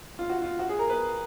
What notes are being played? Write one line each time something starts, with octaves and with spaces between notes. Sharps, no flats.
F4
F#4
F4
F#4
G#4
A#4
B4